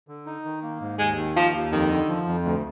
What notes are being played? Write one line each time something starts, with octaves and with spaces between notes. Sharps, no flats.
D3
D#4
D#3
A#3
G#2
D#2 G#3
D#3
F3 A#3
D#2
F2 D#3
D3
F3
F2
D2